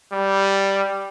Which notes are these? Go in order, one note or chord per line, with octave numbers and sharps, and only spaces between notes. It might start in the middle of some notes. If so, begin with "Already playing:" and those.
G3